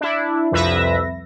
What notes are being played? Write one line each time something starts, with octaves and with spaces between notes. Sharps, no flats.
D4 E4
C2 F2 B4 E5 A#6